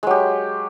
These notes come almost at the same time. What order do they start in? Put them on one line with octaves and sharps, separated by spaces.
G#3 F#3 G4